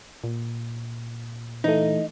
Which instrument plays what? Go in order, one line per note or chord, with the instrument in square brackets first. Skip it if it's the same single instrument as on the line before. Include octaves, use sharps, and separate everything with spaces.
[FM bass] A#2
[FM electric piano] E3 A3 [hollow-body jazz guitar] D#4